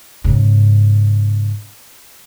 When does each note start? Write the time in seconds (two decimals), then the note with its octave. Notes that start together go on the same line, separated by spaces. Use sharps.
0.24 G#2 C#3